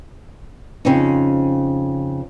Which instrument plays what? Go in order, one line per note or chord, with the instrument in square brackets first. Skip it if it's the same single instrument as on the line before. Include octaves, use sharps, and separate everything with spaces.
[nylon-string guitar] F2 C#3 C4 C#4 D#4